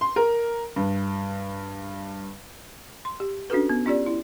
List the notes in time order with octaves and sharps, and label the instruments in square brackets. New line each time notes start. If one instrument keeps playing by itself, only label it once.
[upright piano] C6
A#4
G2
[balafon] C6
G4
C#4 D4 F#4 A4 B4
B3
C#4 F4 G4 D5
E4